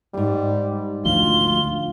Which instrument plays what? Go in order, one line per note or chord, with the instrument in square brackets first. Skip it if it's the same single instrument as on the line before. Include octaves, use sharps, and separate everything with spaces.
[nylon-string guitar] F2 G#2 [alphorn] G3
[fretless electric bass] D2 F3 [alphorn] F4 [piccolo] G7